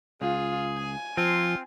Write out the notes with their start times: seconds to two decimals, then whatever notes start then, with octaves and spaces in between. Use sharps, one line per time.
0.22 C#2 F4 G#4
0.78 G#5
1.17 F3 C4 F4